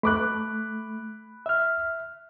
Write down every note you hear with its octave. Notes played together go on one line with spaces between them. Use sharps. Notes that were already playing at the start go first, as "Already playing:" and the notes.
A3 B5 D6 F#6
E5 F6